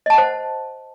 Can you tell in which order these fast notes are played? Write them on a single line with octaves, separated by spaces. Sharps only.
D#5 A5 F#5 C5